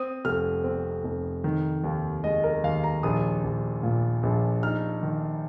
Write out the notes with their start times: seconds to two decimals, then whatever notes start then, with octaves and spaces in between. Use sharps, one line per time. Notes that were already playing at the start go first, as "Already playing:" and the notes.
Already playing: C4 D#6
0.25 F1 F6
0.64 C4
1.04 F1
1.44 D#3
1.84 D#2
2.24 G#3 D#5
2.44 A#4
2.64 D#2 F5
2.84 A#5
3.03 A#1 D#6
3.44 A#1
3.83 A#2
4.23 A#1
4.63 D#4 F6
5.03 D#3